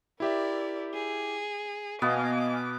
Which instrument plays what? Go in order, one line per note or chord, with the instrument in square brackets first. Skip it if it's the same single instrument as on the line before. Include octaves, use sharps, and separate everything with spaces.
[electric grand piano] E4 G4 E5 [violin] A#4 D5
[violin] G#4
[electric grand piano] B2 [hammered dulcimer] B3 [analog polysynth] D#5 F5 G#5 [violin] D6